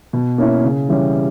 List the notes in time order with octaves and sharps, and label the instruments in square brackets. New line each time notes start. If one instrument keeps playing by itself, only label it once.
[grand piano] B2
A#3 C#4 E4
C#3
E3 G3 C#4 G4